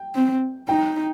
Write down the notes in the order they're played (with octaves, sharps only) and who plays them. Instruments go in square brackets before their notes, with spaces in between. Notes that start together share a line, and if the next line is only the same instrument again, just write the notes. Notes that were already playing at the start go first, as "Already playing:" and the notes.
Already playing: [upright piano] G5
[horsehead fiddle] C4
[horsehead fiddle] D#4 [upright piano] G5